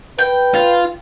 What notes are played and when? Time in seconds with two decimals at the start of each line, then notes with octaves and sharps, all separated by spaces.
0.19 B4 G5
0.55 F4